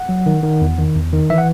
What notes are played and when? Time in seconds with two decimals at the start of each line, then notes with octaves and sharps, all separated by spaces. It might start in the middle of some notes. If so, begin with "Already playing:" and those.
Already playing: F#5
0.09 F#3
0.26 D#3
0.43 D#3
0.61 E2
0.78 D#3
0.96 E2
1.13 D#3
1.30 E3 E5
1.38 F#5